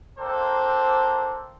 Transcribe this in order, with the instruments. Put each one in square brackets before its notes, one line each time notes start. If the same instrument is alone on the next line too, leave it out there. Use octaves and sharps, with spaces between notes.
[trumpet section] A#3 C4 D4 A4 A#4 C5